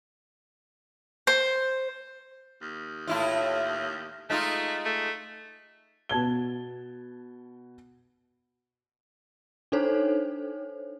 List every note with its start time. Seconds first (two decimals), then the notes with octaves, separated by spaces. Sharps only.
1.27 C5
2.62 D#2
3.07 A2 E4 F4
4.30 G#3 A3 D#4 F4
4.85 A3
6.09 B2 A5 G#6 G7
9.72 D4 D#4 A4 C5 C#5